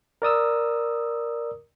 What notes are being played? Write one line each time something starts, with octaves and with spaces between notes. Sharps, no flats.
A#4 D5 D#6 E6